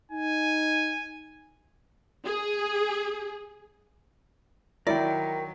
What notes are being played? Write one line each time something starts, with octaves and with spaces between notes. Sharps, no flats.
D#4 G#5
G#4
D#3 F#3 E4 A#4 D5 G5